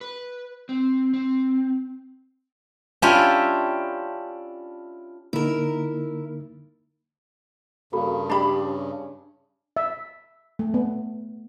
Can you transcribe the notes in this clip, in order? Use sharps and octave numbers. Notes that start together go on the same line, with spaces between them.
B4
C4
C4
C#4 D4 E4 F4 G4
D3 A#3 D#4 E4 A#4
G2 C#3 A#3 F#4 A4 B5
D4 G4 A5 B5
C#4
E5
A3
B3